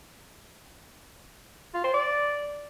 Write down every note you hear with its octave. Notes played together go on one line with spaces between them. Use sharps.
F4
C5
D5